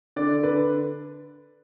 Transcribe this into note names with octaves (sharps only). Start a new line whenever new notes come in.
D3 D5
D3 B4